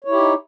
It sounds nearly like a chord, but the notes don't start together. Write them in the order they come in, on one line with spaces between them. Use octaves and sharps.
C#5 E4 G4 D#4